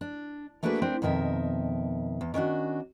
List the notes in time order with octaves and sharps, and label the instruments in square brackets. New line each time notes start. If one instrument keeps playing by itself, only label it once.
[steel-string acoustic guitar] D4
A3 A#3 D4 F#4 G#4 B4
C4 D4 E4 A#4
F2 B2 D#3 A#4 E5
E2
D#3 C#4 D4 F#4